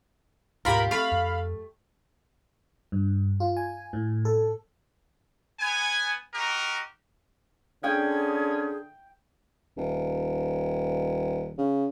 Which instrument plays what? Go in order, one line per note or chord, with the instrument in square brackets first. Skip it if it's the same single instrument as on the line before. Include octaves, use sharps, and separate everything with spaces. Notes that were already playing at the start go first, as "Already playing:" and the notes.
[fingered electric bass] D2 G#2 B2 [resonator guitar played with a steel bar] F4 G4 [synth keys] A#4 B5
[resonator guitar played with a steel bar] A3 [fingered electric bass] C4 [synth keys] F5 B5
[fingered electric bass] F2
[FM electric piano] G2
F4
G#5
A2
A4
[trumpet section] B3 G#5
D#4 F#4 G4 A#4
[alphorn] D3 [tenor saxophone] C#4 [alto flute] G#4 [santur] G5
[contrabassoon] D#1
C#3